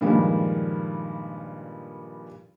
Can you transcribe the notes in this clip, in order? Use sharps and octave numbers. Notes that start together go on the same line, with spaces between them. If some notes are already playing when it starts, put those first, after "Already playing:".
G2 A#2 D#3 F3 G3 G#3